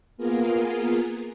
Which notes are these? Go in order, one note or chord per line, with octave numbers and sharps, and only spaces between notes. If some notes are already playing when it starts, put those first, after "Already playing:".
A#3 B3 F4 G#4 A#4